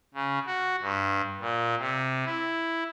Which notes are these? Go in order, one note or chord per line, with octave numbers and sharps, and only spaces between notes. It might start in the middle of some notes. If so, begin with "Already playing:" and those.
C#3
F#4
G2
A#2
C3
E4